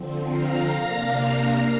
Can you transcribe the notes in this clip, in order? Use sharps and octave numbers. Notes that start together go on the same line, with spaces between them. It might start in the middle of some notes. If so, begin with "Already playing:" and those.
Already playing: D3 F3 C4
F5 A#5
C3 A#3 D4